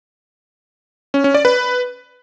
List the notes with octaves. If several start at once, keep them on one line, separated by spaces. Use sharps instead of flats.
C#4
C#4
D5
B4